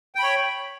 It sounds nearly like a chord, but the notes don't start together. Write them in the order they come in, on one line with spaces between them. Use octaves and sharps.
G5 B5 C#5